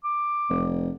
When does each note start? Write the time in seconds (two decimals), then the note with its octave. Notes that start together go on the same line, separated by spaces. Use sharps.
0.04 D6
0.50 F1